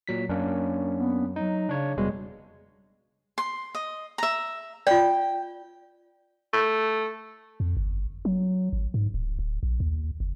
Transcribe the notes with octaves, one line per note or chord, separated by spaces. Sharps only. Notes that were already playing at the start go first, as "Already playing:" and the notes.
A#2 F#3 B6
F#2 A#3 C#4 D4
B3
F#3 D#4
C#3 D4 C#5
F1 B2 G3 G#3
C6
D#5
E5 A#5
F4 D5 G5
A3
F2
G1
F#3
G#1
G#2
D1
D1
A#1
D#2
F#1